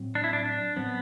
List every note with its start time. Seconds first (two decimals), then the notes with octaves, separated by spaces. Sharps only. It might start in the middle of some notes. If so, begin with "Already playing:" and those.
Already playing: A2 F#3 C4
0.15 D4
0.24 E4
0.33 D4
0.45 D4
0.76 A2 F#3 B3 C4